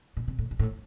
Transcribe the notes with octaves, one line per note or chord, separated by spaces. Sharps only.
A#2
C3
A2
G2
A2